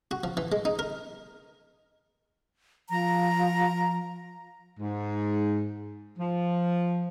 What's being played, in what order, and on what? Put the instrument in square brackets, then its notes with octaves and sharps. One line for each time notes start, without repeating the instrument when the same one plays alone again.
[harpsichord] F#4
F3
E3
G#3
D#4
A#4
[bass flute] F3 [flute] A#5
[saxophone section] G#2
F3